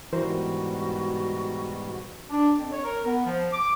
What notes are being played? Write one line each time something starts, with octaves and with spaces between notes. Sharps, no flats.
G#2 B2 E3 G3 F#4 A#4 C5
D4
F2
C#5
A#4
B3
F3
D6